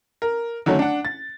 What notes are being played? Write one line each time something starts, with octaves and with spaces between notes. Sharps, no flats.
A#4
D3 D#3 F#3 A3 C#4
D4 F#5
A6